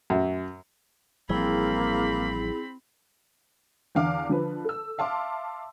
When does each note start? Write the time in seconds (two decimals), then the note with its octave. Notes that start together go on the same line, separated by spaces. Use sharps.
0.10 F#2
1.29 A1 F3 G3 A#3 C4 E4 G#4 B5
3.95 E2 D3 F5 D6
4.29 D3 F3 B4
4.64 A4 E6
4.98 E5 F5 A5 C6 D6